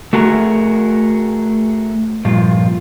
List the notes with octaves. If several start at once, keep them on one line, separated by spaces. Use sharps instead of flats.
A3 F#4 G#4 A#4
G2 A#2 F3 F4